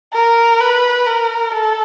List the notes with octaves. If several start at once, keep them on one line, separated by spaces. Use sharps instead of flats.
A#4
B4
A#4
A4